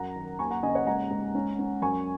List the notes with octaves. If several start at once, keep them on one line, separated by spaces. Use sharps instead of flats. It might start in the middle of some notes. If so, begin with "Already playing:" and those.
Already playing: F#2 F#5 A#5
D#3
D#2 G#5 C#6
F#5 A#5
C#3 D#5 G#5
C#5 F#5
G#2 F#5 A#5
G#2
C#4
C#4
F#2 G#5 C#6